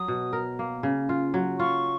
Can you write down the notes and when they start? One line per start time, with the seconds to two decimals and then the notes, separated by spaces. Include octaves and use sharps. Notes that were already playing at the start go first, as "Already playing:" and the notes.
Already playing: F#3 D#6
0.08 B2
0.33 A#4
0.59 A#3
0.83 C#3
1.09 F4
1.34 F#3
1.59 F4 C#6